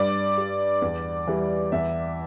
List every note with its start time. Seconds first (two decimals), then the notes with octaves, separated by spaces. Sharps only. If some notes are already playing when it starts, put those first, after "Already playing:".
Already playing: G2 D5
0.38 G3
0.82 E2
1.27 E3 G3
1.72 E2 E5